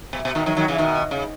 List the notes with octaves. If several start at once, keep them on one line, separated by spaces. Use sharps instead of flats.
B2
B2
B2 D#3
D#3 F#3
D#3 F#3
C#3 E3
B2 D#3
C#3